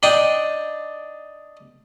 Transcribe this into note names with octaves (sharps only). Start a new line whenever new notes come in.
D4 D#4 D5 D#5 G5